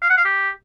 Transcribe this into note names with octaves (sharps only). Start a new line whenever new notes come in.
F5
F#5
F5
G4